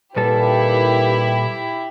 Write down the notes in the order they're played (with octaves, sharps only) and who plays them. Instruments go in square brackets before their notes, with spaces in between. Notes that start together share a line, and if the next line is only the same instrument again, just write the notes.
[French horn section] D#2 B4 [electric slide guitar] A#2 G3 A4 [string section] E4 G4